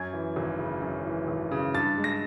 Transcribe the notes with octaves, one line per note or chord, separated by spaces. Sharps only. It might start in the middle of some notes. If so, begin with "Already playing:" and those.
Already playing: F#2 G#6
E3
G#1
C#3
F#2
E3
G#1
C#3
G2 A6
G#3
A#6